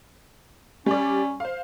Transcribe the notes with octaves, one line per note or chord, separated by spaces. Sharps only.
G3 C#4 D5
C5 F5